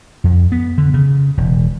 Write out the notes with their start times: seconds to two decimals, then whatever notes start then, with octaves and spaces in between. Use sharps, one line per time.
0.24 F2
0.52 B3
0.78 D3
0.94 C#3
1.37 E1